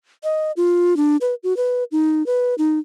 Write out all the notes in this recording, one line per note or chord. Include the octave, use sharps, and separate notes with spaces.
D#5
F4
D4
B4
F#4
B4
D#4
B4
D#4